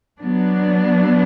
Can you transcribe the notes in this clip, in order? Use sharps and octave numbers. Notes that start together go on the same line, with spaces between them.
F#3 B3 D4